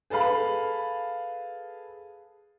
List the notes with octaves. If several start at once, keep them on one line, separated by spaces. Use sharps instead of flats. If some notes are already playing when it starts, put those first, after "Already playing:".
G#4 A4 B4 F5 B5